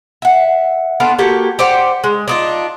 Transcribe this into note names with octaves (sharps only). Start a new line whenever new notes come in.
E5 F#5
B3 D4 F4 A4
A#3 F#4 G4 A4
G4 C5 D5 F#5
G#3
D4 D#4 F4